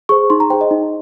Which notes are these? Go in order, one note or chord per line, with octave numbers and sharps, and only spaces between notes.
G#4 C5 C#6
D#4 C6
A#5
G#4 C5 G5
D#5
D#4